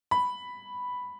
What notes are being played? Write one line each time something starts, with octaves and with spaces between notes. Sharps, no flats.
B5